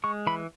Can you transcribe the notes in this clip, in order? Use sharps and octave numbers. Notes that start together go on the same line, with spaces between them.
G#3 C#6
E3 B5